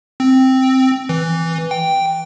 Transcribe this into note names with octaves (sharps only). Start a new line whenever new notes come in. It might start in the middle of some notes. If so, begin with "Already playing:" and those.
C4
E3
G5